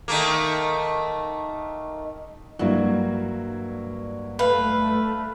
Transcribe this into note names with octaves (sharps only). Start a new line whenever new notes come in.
D#3 A3 A#3
G2 F#3 A#3 E4 F#4
A3 B4 F5